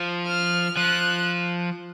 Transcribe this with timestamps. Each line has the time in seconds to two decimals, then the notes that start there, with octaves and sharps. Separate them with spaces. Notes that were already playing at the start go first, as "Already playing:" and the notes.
Already playing: F3
0.27 F6
0.77 F3 F#6